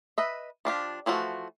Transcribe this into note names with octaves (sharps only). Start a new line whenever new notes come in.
B4 D#5 E5
F3 D4 F4 G4
E3 F3 A3 F#4